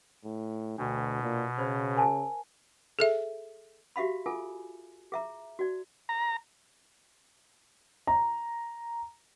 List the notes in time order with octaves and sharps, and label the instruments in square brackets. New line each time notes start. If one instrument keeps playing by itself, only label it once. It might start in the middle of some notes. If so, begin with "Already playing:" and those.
[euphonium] A2
[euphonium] D2 [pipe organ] B2 [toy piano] D4
[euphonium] A#2
[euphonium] C#3 [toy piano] C5 D5 B5
[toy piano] A#4 G#5 A5
[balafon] G#4 A4 E5
[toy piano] F#4 G4 E5 F5 B5
F4 G#4 A4 G#5
G#4 E5 A#5
F#4 D5
[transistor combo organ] A#5
[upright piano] A#5